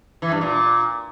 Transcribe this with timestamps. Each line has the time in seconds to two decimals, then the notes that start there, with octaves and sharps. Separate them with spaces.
0.22 E3
0.32 G2
0.41 A#2